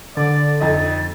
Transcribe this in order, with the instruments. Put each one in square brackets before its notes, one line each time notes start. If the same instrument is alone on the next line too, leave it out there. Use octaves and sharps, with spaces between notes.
[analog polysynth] D3 [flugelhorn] D5 [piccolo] A6
[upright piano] F2 D#5 [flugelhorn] D#4